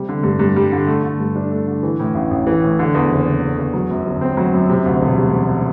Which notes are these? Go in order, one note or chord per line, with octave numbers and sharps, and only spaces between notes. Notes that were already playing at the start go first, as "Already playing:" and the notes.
Already playing: C3 G3
D3
G2
G2
G3
D3
A3
D3
G2
D4
A3
D3
E3
A2
A1
A1
E3
A2
D3
E2
F#1
F#1
D3
E2
F#3
F#2
G1
C4
F#3
F#2
C3
D2
E1
G3
C3